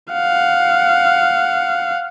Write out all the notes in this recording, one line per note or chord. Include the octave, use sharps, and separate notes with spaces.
F5 F#5